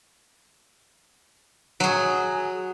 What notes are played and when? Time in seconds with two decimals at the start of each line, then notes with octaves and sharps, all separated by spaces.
1.80 F#3 G#4